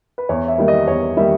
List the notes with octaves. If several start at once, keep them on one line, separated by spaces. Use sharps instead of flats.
B4
E2 C#5
E5
D#3 G3 A#3
D#5
E2 C#5
D#3 G3 A#3 E5